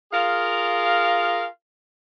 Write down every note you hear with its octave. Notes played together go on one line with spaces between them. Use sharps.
F4 G#4 A#4 F5